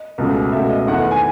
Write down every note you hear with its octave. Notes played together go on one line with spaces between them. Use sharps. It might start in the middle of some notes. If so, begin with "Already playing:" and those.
Already playing: D#5
C#2 B2 A3
C#2 B2 A3 E5
D#5
E2 D#3 A3 F#5
F#5
G#5